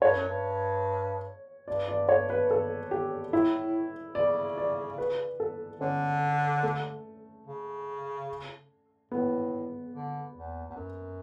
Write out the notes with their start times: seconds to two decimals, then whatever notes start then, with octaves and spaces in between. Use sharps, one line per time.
0.02 G2 C#5
0.16 F#2
0.29 G2
1.68 G2 D5
1.88 D5
2.09 C#5
2.30 B4
2.51 A4
2.91 G4
3.33 A2 E4
4.15 C#3 D5
4.58 D5
4.98 B4
5.40 A4
5.81 D3 C#4
6.63 A3
7.47 C#3
9.11 A2 B3
9.94 D3
10.36 E2
10.70 E2
10.76 F#2